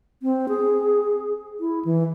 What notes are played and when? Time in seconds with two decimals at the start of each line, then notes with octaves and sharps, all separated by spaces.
0.23 C4
0.49 G#4
1.60 E4
1.85 E3